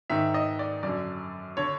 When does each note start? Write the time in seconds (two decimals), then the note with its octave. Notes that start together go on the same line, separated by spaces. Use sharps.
0.10 G#2 D#3 E5
0.34 D#5
0.59 D5
0.83 F#2 D3 D5
1.57 D3 C#5